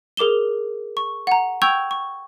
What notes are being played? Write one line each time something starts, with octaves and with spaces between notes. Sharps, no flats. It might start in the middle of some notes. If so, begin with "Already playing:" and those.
G#4 A#4 D6 E7 G7
C#6
F#5 A#5
G5 C#6 E6 G6 G#6 F7
C#6